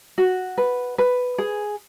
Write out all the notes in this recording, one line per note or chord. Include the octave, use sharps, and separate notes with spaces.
F#4
B4
B4
G#4